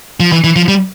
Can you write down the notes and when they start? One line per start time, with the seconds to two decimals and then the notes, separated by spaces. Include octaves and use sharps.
0.20 F3
0.32 E3
0.44 E3
0.56 F3
0.68 G3